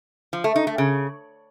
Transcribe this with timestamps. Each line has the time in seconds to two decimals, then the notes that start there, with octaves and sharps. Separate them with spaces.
0.33 F3
0.44 A3
0.56 D#4
0.67 A3
0.78 C#3